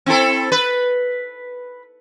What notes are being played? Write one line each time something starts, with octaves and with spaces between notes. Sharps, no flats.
C4 E4 A4
B4